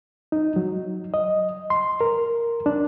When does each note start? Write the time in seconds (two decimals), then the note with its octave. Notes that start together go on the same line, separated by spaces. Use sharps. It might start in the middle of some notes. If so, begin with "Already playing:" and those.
0.32 D#4
0.56 F#3
1.14 D#5
1.70 C6
2.01 A#4
2.66 D4